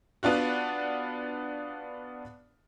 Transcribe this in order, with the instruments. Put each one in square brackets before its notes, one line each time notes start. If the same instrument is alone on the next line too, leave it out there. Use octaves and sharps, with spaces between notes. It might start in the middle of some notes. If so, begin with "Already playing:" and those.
[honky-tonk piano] B3 D4 F4 F#4